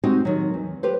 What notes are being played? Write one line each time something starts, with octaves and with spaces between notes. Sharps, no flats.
G#3 C4 D#4 F#4 G4
D#3 F#3
E2
G4 B4 C5